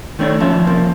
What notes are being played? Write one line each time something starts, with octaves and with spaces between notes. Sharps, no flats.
D#3 A3 D4 C#5
F3 C#4 E5
C2 F3 A#3